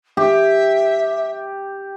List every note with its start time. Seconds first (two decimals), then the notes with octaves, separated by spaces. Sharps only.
0.17 G4 E5